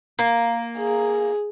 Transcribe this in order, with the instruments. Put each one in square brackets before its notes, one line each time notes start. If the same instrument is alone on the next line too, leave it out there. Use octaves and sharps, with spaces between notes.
[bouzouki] A#3
[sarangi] G#4